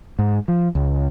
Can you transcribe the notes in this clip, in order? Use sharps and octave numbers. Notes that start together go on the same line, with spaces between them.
G#2
F3
C#2